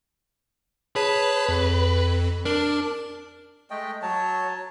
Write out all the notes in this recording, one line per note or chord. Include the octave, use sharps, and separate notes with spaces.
G#4 B4 C#5 A5
F2
D4 A#4
G#3 A3 D#5 G5
F#3 C#5 A5